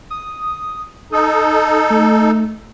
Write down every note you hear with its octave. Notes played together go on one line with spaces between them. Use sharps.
D#6
D#4 A4 D#6
A3